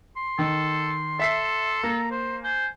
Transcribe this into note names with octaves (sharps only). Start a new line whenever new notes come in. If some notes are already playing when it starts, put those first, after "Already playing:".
C6
D#3 A4
A4 E5 B6 C7
A#3 A#5
C5
C5 G#5